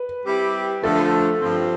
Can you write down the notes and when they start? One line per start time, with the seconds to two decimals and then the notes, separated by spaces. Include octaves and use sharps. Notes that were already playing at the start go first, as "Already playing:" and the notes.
Already playing: B4
0.26 G3 C4 E4 G4
0.83 D3 F3 A3 A4
1.40 G2 F3 C4